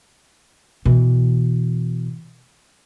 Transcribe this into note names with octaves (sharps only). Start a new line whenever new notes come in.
B2 E3